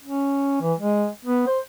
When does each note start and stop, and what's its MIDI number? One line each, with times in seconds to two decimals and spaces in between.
0.03 0.58 61
0.61 0.74 52
0.79 1.07 56
1.25 1.44 59
1.47 1.59 72